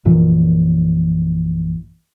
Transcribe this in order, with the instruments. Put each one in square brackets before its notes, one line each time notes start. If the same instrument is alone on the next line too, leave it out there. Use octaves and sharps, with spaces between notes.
[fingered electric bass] A#1 F#2 A#2 E3